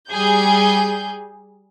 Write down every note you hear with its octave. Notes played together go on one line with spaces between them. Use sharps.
G3 G#4 G6